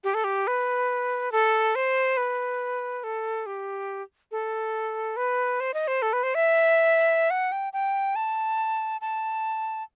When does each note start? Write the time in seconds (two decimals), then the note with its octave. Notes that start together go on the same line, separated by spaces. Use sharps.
0.04 G4
0.14 A4
0.24 G4
0.47 B4
1.32 A4
1.75 C5
2.17 B4
3.04 A4
3.46 G4
4.31 A4
5.17 B4
5.60 C5
5.74 D#5
5.88 C5
6.02 A4
6.13 B4
6.23 C5
6.35 E5
7.30 F#5
7.52 G5
7.73 G5
8.16 A5
9.01 A5